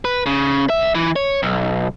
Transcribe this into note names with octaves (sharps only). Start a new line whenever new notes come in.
B4
C#3
C2 E5
E3
C#5
B1